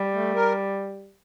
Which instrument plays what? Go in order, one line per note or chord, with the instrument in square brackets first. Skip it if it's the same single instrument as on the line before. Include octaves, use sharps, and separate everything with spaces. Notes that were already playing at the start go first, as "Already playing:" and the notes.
Already playing: [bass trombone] G3
[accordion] A3
A#4